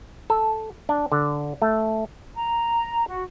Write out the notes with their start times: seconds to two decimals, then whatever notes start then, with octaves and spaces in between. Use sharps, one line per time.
0.30 A4
0.89 D4
1.12 D3
1.62 A3
2.35 A#5
3.08 F#4